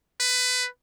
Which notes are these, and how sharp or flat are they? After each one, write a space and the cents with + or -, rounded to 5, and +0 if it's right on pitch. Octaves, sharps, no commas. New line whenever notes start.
B4 +20